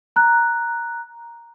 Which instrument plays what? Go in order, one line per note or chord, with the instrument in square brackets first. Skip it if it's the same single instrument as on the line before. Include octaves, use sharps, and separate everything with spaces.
[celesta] A#5 F#6